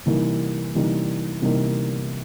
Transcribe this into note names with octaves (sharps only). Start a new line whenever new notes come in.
C3 E3 G3 A#3 D#4
C3 E3 G3 A#3 D#4
C3 E3 G3 A#3 D#4